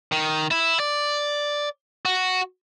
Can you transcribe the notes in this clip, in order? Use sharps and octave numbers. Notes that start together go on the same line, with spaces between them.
D#3
E4
D5
F#4